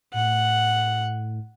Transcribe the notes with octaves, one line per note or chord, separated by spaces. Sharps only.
A2 F#5